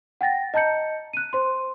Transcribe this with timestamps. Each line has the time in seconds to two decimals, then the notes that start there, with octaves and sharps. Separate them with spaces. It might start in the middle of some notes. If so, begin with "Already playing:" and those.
0.21 F#5 G5 A6 A#6
0.54 D#5 A5 A#5 G6 C#7
1.13 F#6 D#7
1.33 C5 C6